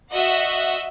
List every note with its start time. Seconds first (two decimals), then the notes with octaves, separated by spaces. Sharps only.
0.12 F#4 D#5 E5 F#5